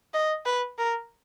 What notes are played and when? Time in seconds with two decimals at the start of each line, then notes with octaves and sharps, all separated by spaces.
0.14 D#5
0.46 B4
0.78 A#4